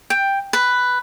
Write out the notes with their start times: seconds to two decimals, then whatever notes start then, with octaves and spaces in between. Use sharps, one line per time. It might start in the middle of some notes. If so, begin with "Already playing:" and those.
0.10 G5
0.53 B4